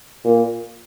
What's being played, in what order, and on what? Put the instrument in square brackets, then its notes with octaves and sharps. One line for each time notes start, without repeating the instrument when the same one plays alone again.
[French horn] A#2